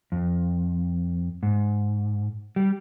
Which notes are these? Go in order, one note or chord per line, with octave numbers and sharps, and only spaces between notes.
F2
G#2
G3